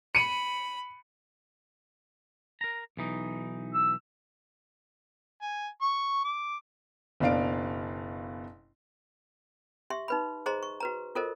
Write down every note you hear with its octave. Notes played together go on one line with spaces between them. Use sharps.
B5 C#7 D#7
A#4 A#5
B1 E3 D#4
E6
G#5
C#6
D6
F#1 B2 D4 F5 D7
G4 E5 C6
D#4 B4 B5
G#4 C5 D#5 A#5 C6
C#6
F#4 B4 A#5
F4 A4 A#4 C5 D#5